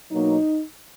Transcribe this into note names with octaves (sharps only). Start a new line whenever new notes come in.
B2 F#3 A#3 D#4